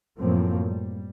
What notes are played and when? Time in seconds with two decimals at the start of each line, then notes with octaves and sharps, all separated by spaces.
0.19 F#2 A2 F3 A#3 C4
0.66 G3